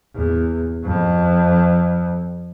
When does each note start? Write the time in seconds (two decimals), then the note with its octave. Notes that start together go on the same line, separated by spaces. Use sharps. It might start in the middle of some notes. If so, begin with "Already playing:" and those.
0.15 E2
0.84 F2